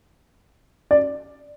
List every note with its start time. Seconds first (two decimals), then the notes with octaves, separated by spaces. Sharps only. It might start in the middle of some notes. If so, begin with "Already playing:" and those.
0.91 D5